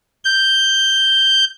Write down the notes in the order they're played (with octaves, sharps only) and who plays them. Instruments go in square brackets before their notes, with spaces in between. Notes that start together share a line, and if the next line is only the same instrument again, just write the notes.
[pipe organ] G6